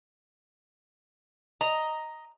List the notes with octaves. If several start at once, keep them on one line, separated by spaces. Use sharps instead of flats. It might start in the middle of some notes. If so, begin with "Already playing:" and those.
D#5 A#5